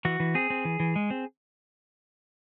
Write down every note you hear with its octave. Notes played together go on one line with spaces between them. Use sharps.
E3 F#4
E3
C4 G#4
C4
E3
E3
G#3
C4